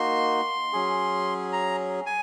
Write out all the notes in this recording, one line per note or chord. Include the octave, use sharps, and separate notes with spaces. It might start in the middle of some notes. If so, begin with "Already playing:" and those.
Already playing: A#3 D#4 F#4 C6
F#3 C#4 G#4
A#5
G#5